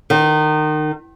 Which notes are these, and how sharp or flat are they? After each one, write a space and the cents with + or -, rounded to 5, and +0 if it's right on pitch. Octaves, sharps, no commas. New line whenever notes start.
D#3 -25